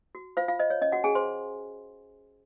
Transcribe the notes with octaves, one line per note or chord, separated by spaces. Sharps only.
F#4
F4 C5 F5
F4 F5
C5 D#5
C#5
C#4 D#5
F#4 F#5
C#4 G#4 G#5
C5 C6